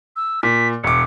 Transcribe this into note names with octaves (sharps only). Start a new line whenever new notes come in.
E6
A#2 B6
E1 D6 C#7